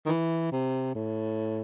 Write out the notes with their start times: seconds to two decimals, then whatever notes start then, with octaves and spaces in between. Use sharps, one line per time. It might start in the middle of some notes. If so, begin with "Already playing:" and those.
0.05 D#3
0.09 E3
0.52 C3
0.95 A2